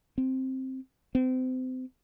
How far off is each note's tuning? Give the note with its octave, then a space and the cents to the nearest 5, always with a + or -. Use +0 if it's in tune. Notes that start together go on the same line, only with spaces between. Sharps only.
C4 +5
C4 -30